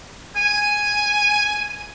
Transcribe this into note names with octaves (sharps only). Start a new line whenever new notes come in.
G#5